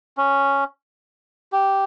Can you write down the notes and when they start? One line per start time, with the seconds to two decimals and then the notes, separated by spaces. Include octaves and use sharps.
0.17 C#4
1.52 G4